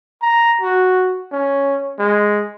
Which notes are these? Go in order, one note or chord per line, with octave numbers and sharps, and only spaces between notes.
A#5
F#4
C#4
G#3